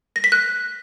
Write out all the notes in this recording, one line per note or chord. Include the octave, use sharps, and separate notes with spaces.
A#6
B6
F#6